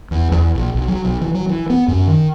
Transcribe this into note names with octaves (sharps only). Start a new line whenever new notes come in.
E2
E2
A#1
B1
F#3
B1
E3
F#3
E3
B3
F#2
D#3